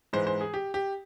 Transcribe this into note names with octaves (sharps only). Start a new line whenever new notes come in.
G#2 E3 G#3 C5
C5
G#4
G4
G4